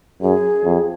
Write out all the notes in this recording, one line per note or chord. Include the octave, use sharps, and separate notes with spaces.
F#2 G#4
F2